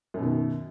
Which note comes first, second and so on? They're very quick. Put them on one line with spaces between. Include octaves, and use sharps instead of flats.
F#2 B2 D#3